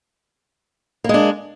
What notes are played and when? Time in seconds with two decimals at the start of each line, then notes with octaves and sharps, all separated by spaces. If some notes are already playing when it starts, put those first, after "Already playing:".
1.04 A#3
1.09 G#3
1.14 D4